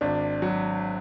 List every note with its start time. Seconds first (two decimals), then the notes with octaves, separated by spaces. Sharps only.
0.01 G#1 D4
0.42 F#3